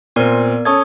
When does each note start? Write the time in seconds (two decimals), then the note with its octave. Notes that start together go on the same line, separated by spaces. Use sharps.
0.16 A#2 B3 C4 A#4 D5
0.65 C#4 A4 C#6 D#6 G#6